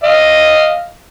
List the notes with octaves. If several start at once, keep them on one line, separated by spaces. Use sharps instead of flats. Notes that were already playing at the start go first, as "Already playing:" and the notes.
D#5 F5